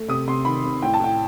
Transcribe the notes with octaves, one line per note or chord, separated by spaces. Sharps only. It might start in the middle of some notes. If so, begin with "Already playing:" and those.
Already playing: A3
C3 D#6
C3 C6
D#3 B5
C3
A2 G5
A5
A2 G5